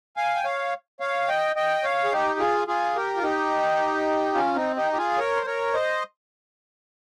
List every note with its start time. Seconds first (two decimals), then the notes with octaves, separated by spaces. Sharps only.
0.17 F5 G#5
0.35 G5
0.44 C#5 F5
1.00 C#5 F5
1.28 D#5 G5
1.56 D#5 G5
1.84 C#5 F5
2.04 G#4
2.12 D#4 G4
2.39 F4 G#4
2.68 F4 G#4
2.96 G4 A#4
3.17 F4
3.23 D#4 G4
4.34 C#4 F4
4.55 C4 D#4
4.76 D#4 G4
4.93 G4
4.98 F4 G#4
5.18 A#4 C#5
5.36 C5
5.46 A#4 C#5
5.74 C5 D#5